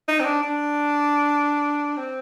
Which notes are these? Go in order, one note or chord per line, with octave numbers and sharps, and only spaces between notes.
D#4
C4
D4
D4
C4